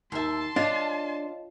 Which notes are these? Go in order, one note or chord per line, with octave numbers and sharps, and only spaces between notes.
D#2 E5 A5 C6
D4 F4 C#5 D#5 F5